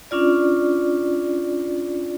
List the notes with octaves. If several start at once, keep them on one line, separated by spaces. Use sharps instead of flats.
C#4 D4 F4 D5